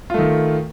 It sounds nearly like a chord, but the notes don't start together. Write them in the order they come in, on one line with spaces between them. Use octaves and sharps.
F4 A3 D#3